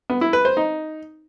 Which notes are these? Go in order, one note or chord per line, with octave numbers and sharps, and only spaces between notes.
B3
E4
B4
C5
D#4